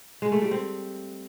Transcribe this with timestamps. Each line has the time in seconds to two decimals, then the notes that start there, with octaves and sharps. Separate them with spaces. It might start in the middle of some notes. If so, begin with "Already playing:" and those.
0.22 G#3
0.32 A3
0.42 G3
0.51 C4